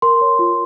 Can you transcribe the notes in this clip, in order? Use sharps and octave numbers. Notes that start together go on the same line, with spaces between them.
A#4 C6
C#5
F4